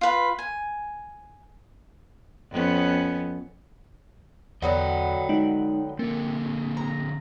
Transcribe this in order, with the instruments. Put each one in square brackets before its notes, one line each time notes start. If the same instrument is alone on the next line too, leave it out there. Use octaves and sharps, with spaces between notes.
[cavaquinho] F4 B4
G#5
[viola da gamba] F2 B3 C#4
[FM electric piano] E2 [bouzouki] D3 F#3 B3 [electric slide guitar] D#5 G5
[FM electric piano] G#3 D#4
[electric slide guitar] D3 C4 [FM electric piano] A#3
[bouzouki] A#5